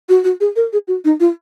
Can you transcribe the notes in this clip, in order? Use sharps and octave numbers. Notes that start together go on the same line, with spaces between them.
F#4
F#4
G#4
A#4
G#4
F#4
D#4
F4